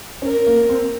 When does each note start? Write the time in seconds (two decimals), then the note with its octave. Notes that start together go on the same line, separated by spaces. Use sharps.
0.22 C#4 A#4
0.47 A#3
0.69 C4